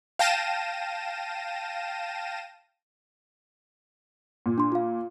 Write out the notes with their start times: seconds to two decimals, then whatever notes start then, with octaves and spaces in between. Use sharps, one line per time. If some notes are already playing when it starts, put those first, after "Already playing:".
0.19 F5 G5 A5 A#6 D#7 E7
4.46 A#2
4.58 D4 C6
4.72 F4 F5